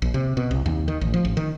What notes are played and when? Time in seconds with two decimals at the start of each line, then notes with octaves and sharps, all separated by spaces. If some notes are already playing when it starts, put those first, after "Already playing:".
0.02 A#1
0.14 C3
0.37 B2
0.51 C2
0.66 D#2
0.88 D#3
1.01 A1
1.14 F3
1.25 A1
1.37 D#3